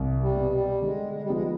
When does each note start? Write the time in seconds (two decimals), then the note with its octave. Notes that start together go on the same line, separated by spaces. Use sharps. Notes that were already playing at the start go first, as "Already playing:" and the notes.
Already playing: C2
0.22 G3
0.37 B2 B3
0.52 G3
0.82 D3 G#3
1.13 G#3
1.22 G3
1.29 F3 G#3 B3 D#4